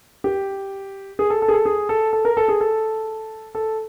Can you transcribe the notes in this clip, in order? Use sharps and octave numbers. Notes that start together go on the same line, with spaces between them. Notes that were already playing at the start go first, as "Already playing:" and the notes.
G4
G#4
A4
A4
G#4
A4
G#4
A4
A4
A#4
A4
G#4
A4
A4